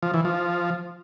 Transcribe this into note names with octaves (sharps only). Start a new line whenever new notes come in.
F3
E3
F3